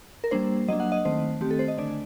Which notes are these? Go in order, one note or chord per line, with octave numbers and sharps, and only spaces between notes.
A#4
G3 A#3 D4 C5
F#3 A#3 D4 D#5
F#5
D#5
D#3 A3 C4 C5
D#3 A3 C4 G4
A4
C5
D#5
D3 A3 D4 D5